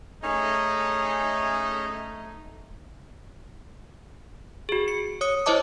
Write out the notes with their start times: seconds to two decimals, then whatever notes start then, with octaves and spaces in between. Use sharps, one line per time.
0.23 A3 C#4 D#4 G#4 C#5
4.69 F#4 G#4
4.88 C#7
5.21 C#5 D#6 C#7
5.46 E4 C5 C#5 D#5 A5 D6